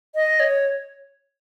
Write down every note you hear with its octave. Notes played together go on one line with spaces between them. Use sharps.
D#5
C#5